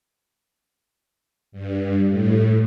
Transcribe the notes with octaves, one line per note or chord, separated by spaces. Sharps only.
G2
A2